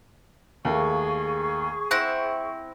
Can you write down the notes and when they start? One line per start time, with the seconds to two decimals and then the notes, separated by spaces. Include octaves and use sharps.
0.65 D#2 A3 A#3 G#4 C#6
1.91 C4 E4 F#5 A#6